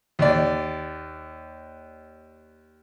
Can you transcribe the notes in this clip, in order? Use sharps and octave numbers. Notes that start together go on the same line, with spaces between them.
D#2 D5